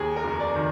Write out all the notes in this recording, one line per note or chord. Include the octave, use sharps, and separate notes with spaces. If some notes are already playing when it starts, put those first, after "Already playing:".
Already playing: D#2 G#4
A#4
F1
D5
D#3